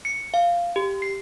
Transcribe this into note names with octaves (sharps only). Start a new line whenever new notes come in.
C#7
F5
G4
C7